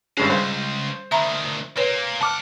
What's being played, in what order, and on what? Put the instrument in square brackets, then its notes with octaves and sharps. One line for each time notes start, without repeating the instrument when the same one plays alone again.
[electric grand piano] G#1 G2 C#4 [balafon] G#4 [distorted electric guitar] F5 A5
[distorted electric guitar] C#2 [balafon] G3 [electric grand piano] C5
[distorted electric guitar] D2 D#3 [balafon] E5 A#5 B5
[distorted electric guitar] A#2 A#3 [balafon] B4 C#5
[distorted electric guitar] C#2 F#5 [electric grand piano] A5 D6 F6